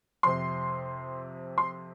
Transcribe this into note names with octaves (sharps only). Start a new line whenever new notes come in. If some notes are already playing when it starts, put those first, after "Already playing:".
F2 C3 C6
C6